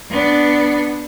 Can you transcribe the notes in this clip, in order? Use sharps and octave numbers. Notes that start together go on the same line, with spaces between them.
B3 D4